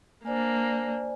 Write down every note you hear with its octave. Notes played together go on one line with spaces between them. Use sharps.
A#3 D4 C5 D5 G#5